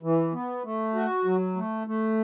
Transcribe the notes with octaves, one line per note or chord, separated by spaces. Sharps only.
E3
B3
A3
F#4
F#3
A3
A3